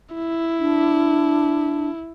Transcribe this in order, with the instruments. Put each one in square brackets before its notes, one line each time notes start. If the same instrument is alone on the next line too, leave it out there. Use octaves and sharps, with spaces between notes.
[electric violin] E4
[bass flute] D4